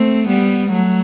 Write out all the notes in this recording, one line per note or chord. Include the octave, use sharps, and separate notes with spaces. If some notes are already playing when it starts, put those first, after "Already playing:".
Already playing: A3 C4
G3 B3
F#3 A3